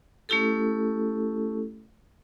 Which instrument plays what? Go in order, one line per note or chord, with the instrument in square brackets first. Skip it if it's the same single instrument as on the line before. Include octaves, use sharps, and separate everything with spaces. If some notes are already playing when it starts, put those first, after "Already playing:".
[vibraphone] A3 C#4 E4 G4 A4